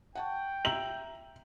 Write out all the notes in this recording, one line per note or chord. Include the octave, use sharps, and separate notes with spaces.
F#5 G5 A5 C#6
E5 A#5 E6 F#7